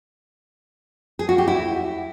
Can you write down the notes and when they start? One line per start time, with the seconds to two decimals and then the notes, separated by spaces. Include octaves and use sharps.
1.19 G#4
1.29 F#4
1.38 G4
1.48 E4